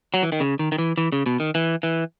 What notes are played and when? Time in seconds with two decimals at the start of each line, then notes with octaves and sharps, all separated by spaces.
0.14 F#3
0.23 E3
0.32 D#3
0.40 C#3
0.59 D#3
0.72 D#3
0.78 E3
0.98 E3
1.12 C#3
1.26 B2
1.40 D#3
1.55 E3
1.83 E3